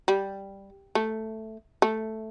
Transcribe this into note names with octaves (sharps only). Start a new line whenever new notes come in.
G3
A3
A3